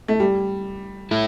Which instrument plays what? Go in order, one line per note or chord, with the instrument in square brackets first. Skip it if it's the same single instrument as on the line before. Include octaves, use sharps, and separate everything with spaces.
[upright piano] A3
G3
[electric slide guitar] A3 E4